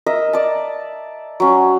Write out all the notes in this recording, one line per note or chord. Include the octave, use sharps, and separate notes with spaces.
A#4 D#5 E5
D5 A5
F#3 C#4